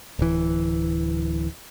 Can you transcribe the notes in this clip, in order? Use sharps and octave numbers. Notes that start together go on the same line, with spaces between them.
D1 E3